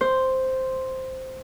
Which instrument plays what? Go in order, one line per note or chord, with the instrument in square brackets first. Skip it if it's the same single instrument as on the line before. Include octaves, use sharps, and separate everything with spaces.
[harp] C5